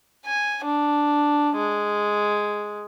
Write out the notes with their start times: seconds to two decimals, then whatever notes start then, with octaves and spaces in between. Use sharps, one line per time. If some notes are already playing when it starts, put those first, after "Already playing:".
0.26 G#5
0.65 D4
1.56 G#3